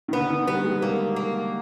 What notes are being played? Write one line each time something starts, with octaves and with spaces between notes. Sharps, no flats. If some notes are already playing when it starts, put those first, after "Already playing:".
D#3
D3 B3
D#3
G3 B3
G#3
A#3
A#3